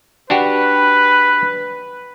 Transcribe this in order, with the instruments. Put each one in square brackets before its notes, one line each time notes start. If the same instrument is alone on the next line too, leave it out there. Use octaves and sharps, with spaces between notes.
[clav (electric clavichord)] D4 F#4 G4 [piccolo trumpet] B4